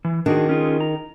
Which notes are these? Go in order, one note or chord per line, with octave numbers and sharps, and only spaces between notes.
E3
D#3 D4 F#4 G#4
C#4 F4 G#4
A#5